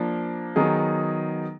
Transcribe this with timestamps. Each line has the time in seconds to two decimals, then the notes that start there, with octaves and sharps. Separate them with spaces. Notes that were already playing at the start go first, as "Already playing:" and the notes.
Already playing: F3 A#3 D4
0.56 D#3 F#3 B3 D#4 G#4